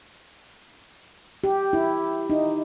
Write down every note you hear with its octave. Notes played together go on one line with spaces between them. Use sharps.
G4
E4
D#4